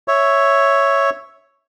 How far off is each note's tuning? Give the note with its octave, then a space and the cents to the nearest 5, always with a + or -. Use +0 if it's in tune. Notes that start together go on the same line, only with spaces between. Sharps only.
C#5 +0 E5 +0